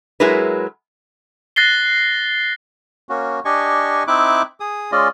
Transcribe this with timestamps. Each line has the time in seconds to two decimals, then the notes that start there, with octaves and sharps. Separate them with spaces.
0.20 F#3 G#3 E4 G#4 A#4 B4
1.56 F#6 A6 A#6 C7 G7
3.09 A#3 C#4 F#4
3.45 D4 G4 D#5 G#5 C#6
4.08 C4 D#4 E4 E5 D6 F#6
4.60 G#4 D#6
4.92 G#3 C#4 F4 D5 D#5